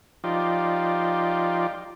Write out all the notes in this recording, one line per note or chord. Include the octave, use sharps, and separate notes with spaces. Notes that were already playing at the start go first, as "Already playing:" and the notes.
F3 D#4 F4 G4 D5